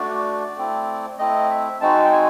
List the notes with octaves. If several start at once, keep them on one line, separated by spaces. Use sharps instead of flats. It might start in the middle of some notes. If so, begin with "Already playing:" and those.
Already playing: A3 D4 F#4 D5
A3 C4 E4
A3 C4 E4 D#5
E5
G#3 C4 D#4 F#4 A5
G5
G#5